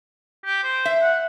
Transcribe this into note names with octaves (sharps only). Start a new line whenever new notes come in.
G4
C5
E5
F#5